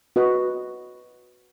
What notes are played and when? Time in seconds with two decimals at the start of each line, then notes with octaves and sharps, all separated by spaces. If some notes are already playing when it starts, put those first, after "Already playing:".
0.16 F#4 B4 D#5